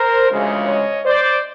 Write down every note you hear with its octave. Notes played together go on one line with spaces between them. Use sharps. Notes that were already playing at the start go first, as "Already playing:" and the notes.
Already playing: A#4 C5
D2 C#3 F3 G#3
C#5 D#5
C5 D5